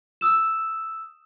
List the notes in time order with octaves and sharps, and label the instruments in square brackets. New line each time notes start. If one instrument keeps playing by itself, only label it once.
[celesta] D#6 E6 E7